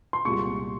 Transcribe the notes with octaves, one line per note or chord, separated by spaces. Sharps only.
C6
C2 A#2 G#3 C#6